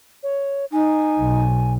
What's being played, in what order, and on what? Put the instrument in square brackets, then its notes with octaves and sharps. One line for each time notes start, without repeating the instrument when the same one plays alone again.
[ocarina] C#5
[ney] D#4 [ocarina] G#5
[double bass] B1